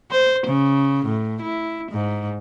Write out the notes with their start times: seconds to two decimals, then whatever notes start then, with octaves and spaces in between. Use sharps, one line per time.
0.11 C5
0.47 C#3
1.06 A2
1.42 E4
1.92 G#2